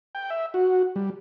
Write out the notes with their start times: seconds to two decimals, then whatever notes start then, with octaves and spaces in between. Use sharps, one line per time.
0.15 G5
0.30 E5
0.54 F#4
0.96 G3